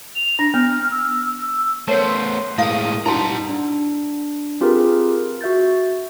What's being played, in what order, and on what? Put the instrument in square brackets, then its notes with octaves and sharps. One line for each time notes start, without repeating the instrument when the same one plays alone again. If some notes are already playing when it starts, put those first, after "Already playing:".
[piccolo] F7
[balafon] D4 [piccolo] A#6
[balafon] B3 [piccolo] F6
[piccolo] E6
E6
[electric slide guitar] A3 B3 [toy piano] A#4 C#5 A5 [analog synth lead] C5
[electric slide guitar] A2 G#3 A#3 [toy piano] E4 F5 [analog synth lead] D#6
[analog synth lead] G2 [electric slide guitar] D#4 F#5 A#5 [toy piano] E4 A5 C6
[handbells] D4
C4 F4 G4 G#4 A#4 B4
F#4 E5 G6 A6